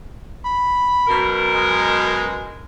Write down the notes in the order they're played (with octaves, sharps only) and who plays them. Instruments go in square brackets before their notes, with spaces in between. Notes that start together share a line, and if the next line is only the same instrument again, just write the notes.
[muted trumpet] B5
[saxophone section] F#2 B2 A#4
[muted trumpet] G#3